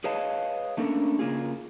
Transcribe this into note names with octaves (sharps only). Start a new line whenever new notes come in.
G#4 B4 C#5 D#5 F5 A5
A3 A#3 C#4 D4 A4 A#4
C#3 A#3 F4 G#4